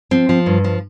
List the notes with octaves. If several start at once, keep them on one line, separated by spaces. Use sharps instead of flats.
F3 C4
F3
G2
F3